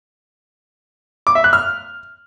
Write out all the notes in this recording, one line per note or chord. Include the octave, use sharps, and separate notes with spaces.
D6
E5
F#6
F6